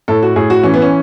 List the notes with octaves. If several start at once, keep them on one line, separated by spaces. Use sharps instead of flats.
A2 A4
F#4
A2 G#4
F#4
E3 C#4
B3
C#4